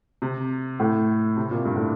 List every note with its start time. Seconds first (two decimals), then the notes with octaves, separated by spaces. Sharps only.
0.22 C3
0.80 A2
1.37 C3
1.51 A#2
1.65 G2
1.76 A2